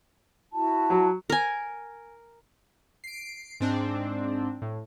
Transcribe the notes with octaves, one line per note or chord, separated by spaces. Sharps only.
E4 F#4 A5
F#3
A#4 G#5
C7 D7
G#2 C4 D4
A2